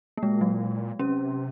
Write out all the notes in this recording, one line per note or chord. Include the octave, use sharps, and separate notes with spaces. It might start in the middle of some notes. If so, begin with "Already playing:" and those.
A#3
A#2 G#3
F#3
C3 C#4